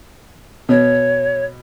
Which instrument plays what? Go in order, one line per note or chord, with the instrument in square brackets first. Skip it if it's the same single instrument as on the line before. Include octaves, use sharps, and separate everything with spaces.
[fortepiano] B2 [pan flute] C#5